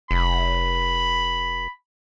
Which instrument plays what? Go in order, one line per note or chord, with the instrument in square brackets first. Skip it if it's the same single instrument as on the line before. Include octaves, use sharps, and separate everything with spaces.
[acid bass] F1 [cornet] B5